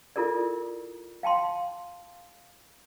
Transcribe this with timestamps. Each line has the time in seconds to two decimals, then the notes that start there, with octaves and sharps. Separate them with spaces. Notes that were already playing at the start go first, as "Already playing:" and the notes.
0.16 E4 F4 A4 A#4 D5
1.23 F5 G5 A5 C6